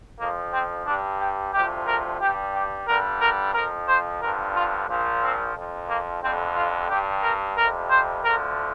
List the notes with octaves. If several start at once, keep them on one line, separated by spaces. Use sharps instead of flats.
F2 F3 A#3
C4
G2 G3 D4
G4
D2 C3 F3 G4
A#4
G2 G3 G4
G4
G2 D3 G3 A#4
A#4
F2 F3 A#4
C5
G2 D3 F3 A#4
F4
A#1 A#2 F3
C4
F2 F3
A#3
F2 D3 G3 C4
F4
G2 G3 G4
A#4
F2 C3 G3 A#4
C5
D2 D3 F3 A#4